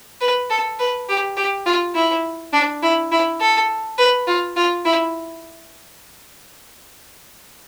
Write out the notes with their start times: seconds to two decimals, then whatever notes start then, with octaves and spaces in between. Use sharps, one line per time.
0.21 B4
0.50 A4
0.79 B4
1.09 G4
1.37 G4
1.66 F4
1.95 E4
2.53 D4
2.83 E4
3.12 E4
3.41 A4
3.98 B4
4.27 F4
4.56 F4
4.85 E4